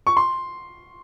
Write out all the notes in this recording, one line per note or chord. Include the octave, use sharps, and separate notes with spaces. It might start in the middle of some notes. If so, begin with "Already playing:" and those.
C#6
C6